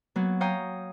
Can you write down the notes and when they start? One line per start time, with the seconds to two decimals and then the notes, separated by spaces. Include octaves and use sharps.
0.16 F#3 A#3 B3
0.41 C#5 F5 G5 A#5 D#6